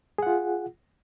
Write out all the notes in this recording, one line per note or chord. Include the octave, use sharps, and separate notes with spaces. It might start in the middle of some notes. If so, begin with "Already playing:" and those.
F4 G#4 F#5